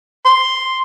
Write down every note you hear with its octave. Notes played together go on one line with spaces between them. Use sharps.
C6